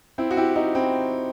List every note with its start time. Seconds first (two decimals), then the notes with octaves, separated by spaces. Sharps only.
0.18 C4 E4
0.31 F#4
0.37 E4 G4
0.56 D#4 F#4
0.75 C4 E4